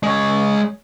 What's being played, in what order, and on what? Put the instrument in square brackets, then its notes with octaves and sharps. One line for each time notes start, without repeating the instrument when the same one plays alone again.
[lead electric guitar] G#3 C#5